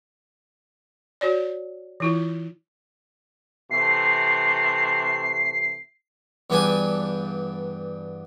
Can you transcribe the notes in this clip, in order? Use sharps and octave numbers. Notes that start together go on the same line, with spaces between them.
F#4 C#5 D5
E3 E4 F4
C3 E3 A3 C7
E2 G2 B3 D4 G#5